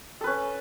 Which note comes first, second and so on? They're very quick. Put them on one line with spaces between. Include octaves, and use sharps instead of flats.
A4 B4 C#4